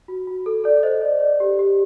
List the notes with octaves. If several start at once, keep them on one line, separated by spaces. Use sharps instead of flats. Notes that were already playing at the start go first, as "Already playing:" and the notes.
F#4
F#4
A4
A4 D5
C5 D#5
D5
D5
G4
G4